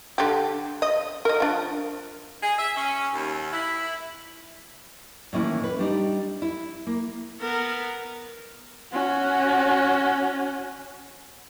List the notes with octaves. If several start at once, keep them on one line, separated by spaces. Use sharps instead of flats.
D3 G4
D#5
A#4 D#5
F3 D4
G#4
E5
C#4
D#2
E4
A2 D#3 E3 A#3 C#4 E4
B4
G3 D4 D#4
E4
A#3
B3 A#4
C#4 F#4